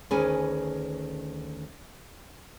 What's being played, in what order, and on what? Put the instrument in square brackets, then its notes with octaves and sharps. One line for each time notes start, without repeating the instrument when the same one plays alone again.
[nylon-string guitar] D2 D#3 C#4 G#4 B4 G#5